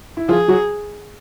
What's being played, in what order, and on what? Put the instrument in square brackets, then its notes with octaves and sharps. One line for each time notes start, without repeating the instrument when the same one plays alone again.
[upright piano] E4
[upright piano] F3 F4 [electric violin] G#4
[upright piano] F#3 F#4